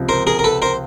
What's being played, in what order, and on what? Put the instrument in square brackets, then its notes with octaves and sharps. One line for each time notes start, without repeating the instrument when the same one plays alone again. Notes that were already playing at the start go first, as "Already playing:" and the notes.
Already playing: [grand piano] C#2 C3 F3
[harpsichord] A#4 C5
G#4 A#4
A#4
A4 B4
A#4 C5